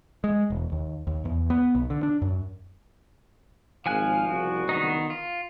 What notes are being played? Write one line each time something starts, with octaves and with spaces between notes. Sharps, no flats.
G#3
E1
D#2
D#2
E2
B3
B1
D3
D4
F#2
G#1 F3 F5 G#5 F#6
F#1 C2 F#4
D#3 B3 D#4
F4